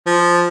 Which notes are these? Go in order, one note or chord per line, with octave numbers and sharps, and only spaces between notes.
F3